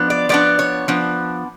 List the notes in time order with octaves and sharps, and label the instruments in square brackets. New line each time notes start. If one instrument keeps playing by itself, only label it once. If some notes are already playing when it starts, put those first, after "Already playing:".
Already playing: [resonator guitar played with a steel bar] F3 B3 D4
D5
F3 B3 D4 D5
C#5
F3 B3 D4